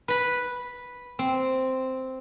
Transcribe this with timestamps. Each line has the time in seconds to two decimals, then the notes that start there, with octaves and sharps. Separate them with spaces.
0.08 B4 B5
1.19 C4